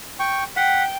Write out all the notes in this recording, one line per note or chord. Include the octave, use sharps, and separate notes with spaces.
G5 C#6
F#5 G5 B6